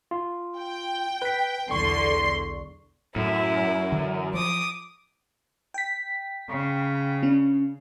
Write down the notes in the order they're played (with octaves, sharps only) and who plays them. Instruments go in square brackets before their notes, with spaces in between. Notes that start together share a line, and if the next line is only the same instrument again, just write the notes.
[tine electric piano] F4
[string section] G5
[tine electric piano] B4 B6
[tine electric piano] B1 C#6 [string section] E2 D3 C6
[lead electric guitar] F#2 [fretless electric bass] A2 [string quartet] E4
[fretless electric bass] D3 E3
[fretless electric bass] F3 [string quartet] D6 D#6
[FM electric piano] G5 B6
[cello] C#3
[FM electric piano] C#4 D4